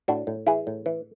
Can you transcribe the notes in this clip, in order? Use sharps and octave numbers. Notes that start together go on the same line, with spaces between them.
A2 D4 F#4
A2
E3 E4 G#4
A2
E3